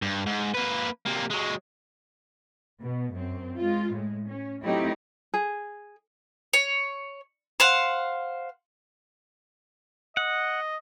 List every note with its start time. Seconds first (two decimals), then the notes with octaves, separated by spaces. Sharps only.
0.02 G2
0.26 G#2
0.54 A#3 B4
1.06 C3 A#3
1.30 F#3 G#3
2.81 B2
3.13 F#2 C4
3.58 G#3 F4
3.94 A2 G#3
4.29 C#4
4.63 F#3 A3 C4 D#4 E4 G4
5.34 G#4
6.53 C#5
7.60 C5 F5 F#5
10.17 D#5 F#5